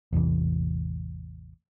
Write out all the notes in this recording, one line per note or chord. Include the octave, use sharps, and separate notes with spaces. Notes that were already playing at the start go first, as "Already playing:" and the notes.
A1 E2 C3 E3